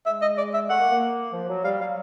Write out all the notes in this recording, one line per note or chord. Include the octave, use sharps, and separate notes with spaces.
G#3 E5
D#5
D5
E5
A3 F#5
A#3
A#3
F3
F#3
G3 F5
F#3 F5